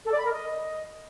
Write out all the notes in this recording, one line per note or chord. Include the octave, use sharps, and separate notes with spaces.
A4
D5
B5
A#4
D#5